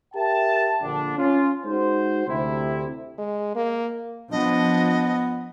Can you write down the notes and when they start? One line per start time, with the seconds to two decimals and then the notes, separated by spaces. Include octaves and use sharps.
0.15 G4 A#4 E5 G5 A5
0.82 A#1 D3 D4
1.17 C#4 F4
1.65 G#3 D#4 F#4 C5
2.28 D2 C3 E4
3.18 G#3
3.56 A#3
4.31 F3 B3 D4 D#5